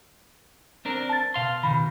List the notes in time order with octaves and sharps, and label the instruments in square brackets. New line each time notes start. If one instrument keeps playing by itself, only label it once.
[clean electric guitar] C4 D4 A#4
[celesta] A5 A6
[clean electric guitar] B2 F5 C6
[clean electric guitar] B2 D#3 [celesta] B5